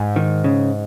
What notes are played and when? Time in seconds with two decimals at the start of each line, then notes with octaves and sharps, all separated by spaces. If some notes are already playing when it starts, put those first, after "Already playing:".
Already playing: G#2
0.16 D#3
0.44 C#3